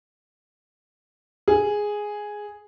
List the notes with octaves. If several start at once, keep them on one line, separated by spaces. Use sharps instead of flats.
G#4